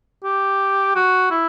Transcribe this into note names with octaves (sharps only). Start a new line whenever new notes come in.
G4
F#4
E4